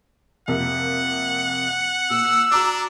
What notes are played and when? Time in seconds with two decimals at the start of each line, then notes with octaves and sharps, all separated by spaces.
0.48 F2 C3 A#3 F#5
2.10 A#2 E6
2.51 D4 F#4 A#5 D6